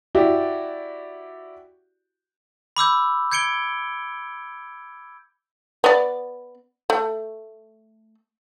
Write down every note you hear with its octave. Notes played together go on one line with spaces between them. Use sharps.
E4 F#4 G4 D5
B5 D6 E6 G6
G6 G#6 C#7 D7 G7
B3 D5
A3